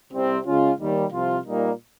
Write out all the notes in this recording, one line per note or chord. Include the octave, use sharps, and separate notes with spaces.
C2 C3 G3 C4
C#3 G#3 C#4 F4
D#2 D#3 G3
C2 C3 F3 C4 F4
A#2 G3 A#3 D#4